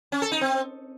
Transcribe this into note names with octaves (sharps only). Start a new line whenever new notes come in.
C#4
A4
D#4
C4